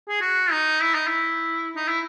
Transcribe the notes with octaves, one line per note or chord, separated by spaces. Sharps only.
G#4
F#4
D#4
E4
D#4
E4
D#4
E4